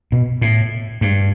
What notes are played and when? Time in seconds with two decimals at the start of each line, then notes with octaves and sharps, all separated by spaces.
0.12 B2
0.41 A2
1.01 G2